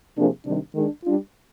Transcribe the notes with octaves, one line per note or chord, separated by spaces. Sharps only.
C3 F3 A#3 D4 G#4
C3 D#3 G3 D4
D#3 G#3 D4
G3 D4 F4